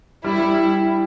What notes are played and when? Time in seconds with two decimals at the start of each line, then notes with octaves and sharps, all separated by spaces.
0.24 G3 E4
0.39 G3